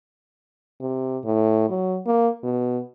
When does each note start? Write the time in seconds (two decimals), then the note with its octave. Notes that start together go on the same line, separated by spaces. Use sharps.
0.81 C3
1.25 A2
1.70 F#3
2.06 A#3
2.44 B2